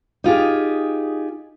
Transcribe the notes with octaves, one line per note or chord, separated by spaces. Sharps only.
D#4 F4 G4 G#4